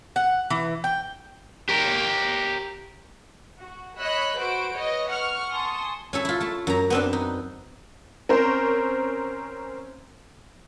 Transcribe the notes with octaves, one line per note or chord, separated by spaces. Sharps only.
F#5
E3
G5
G4 A#4
F#4
C#5 D#5 B5 E6 F#6
F#4 B4 C5 D7
B4 C#5 D#5
F#5 C#6 F6
G#5 A5 C6 C#6 D#6
C#4 E4 A4
E4 F4
A3 A5
F#2 A#5
B3 C4 D4
D#4
C4 C#4 A#4 C5